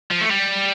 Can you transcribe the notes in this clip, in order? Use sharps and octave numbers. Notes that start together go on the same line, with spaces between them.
F3
A3
G3